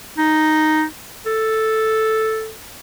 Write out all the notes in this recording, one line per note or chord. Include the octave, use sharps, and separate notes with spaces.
D#4
A4